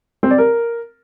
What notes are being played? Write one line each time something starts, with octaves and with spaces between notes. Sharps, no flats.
C4
D5
A#4